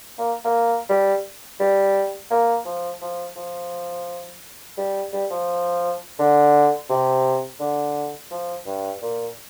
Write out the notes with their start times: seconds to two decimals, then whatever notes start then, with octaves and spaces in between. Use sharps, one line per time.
0.18 A#3
0.45 A#3
0.89 G3
1.60 G3
2.31 A#3
2.65 F3
3.01 F3
3.36 F3
4.77 G3
5.13 G3
5.30 F3
6.19 D3
6.90 C3
7.60 D3
8.31 F3
8.66 G2
9.02 A#2